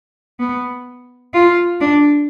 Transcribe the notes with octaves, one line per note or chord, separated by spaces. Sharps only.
B3
F4
D4